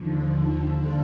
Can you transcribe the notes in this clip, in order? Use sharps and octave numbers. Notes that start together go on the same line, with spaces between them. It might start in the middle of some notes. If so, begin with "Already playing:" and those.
Already playing: D#2 D3 F3
D3 G3 D4 F4 A4